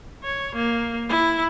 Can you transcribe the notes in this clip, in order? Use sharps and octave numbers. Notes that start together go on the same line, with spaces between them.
C#5
A#3
E4